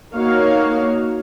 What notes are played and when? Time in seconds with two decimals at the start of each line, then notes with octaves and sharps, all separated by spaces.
0.14 A#3 D#4 F#4 C#5 F5